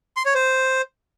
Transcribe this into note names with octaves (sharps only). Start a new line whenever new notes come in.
C6
C#5
C5